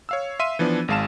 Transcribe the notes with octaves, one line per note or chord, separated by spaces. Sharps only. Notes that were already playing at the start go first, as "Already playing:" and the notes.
C#5 F5 E6
E5 F5 C6 D#7
E3 F3 B3 D4
G#1 G#3 F5 A5 E7